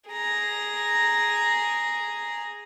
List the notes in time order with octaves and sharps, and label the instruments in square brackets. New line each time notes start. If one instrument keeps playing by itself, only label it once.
[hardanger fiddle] G#4 A#5